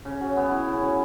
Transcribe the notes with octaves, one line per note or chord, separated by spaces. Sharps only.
C#3
F#3
B3
E4
C#3
F#3